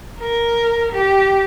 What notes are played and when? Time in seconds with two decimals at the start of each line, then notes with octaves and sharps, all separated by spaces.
0.19 A#4
0.93 G4